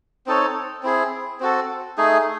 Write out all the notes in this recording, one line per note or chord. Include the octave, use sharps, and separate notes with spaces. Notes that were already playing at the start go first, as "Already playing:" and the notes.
C4 D#4 A4 C#5
C4 E4 G#4
C4 F#4 A4
A3 D#4 G#4